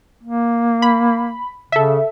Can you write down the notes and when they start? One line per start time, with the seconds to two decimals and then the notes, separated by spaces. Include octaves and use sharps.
0.23 A#3
0.82 B5
1.72 C#3 A4 E5